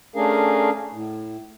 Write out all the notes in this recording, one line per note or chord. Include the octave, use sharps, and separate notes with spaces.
A3 C#4 D4 G#4 A#4 F5
A2